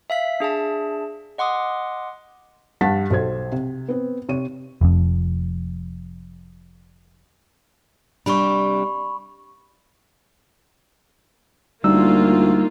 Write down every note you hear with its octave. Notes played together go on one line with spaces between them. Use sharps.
E5 F5 B6
D4 G#4 E5 A5
D#5 F#5 C6 D6 D#6
G2 F#5 A5 A6 B6
B1 A4 C5 G#6
C3
B3 C4
C3 C#5 D#7
F1 F2
C3 G3 D4 B5 C#6
D2 G3 A#3 D#4 F4 E6